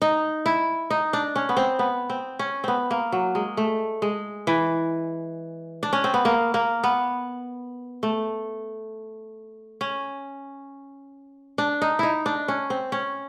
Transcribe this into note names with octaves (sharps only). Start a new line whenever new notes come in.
D#4
E4
D#4
D4
C#4
B3
C4
B3
C4
C#4
B3 C4
A#3
F#3
G#3
A3
G#3
E3
D4
C#4
C4
B3
A#3
A#3
B3
A3
C#4
D4
D#4
D#4 E4
D4
C#4
C4
C#4